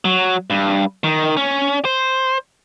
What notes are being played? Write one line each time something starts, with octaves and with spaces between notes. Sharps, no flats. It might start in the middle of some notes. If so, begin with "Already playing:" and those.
F#3
G2
D#3
C#4
C5